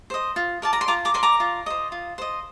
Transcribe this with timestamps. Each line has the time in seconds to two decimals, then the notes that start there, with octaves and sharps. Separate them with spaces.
0.10 C5 D#5
0.36 F4
0.62 A#4 D5 A5
0.73 A#5
0.81 C6
0.88 F4 A#5 D6
1.05 A#5 D6
1.14 A#4 D5 C6
1.23 A#5 D6
1.40 F4
1.66 C5 D#5
1.92 F4
2.18 C5 D#5